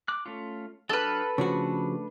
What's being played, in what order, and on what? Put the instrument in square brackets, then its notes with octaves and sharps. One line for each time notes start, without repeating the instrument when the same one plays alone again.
[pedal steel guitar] D6 F#6
A3 C#4 F4
[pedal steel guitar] F#3 D4 F6 [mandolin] A4 B4
[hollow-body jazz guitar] C#3 F3 F#4 [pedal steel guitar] A3 D4